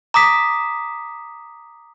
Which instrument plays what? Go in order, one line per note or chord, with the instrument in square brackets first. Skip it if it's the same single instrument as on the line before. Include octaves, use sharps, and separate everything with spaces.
[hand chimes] A#5 D6 D#6 B6